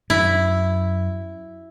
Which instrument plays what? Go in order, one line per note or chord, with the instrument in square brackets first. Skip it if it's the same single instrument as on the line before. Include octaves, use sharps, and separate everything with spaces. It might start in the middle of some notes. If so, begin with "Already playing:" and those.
[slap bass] F#2 [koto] E4